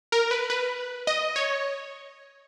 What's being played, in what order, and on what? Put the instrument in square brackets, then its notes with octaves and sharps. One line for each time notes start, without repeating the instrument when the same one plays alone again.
[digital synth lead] A#4
B4
B4
D#5
C#5